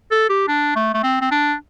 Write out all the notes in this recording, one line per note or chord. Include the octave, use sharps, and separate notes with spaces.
A4
G4
D4
A3
A3
C4
C4
D4